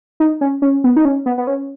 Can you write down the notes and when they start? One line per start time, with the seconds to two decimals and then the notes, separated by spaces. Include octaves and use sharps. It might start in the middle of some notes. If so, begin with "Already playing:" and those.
0.20 D#4
0.41 C#4
0.62 C#4
0.84 B3
0.96 D#4
1.05 C#4
1.26 B3
1.38 B3
1.47 C#4